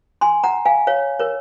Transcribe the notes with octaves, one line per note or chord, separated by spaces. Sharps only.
G#5 C6
F#5 A#5
F5 G#5
C#5 F5
A#4 C#5